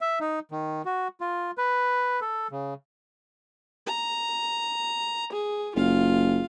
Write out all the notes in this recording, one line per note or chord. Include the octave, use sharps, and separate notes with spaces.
E5
D#4
D#3
F#4
F4
B4
A4
C#3
A#5
G#4
F#1 F4 F5